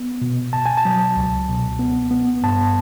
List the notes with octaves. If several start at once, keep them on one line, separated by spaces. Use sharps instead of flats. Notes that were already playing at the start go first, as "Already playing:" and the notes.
Already playing: B3
B2
B2 A5
G#5
A5
F#3
C#2
B2
B3
B3
G2 A5